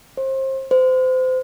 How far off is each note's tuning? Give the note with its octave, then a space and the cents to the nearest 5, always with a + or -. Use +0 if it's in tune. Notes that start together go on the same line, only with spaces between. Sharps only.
C5 +30
C5 -30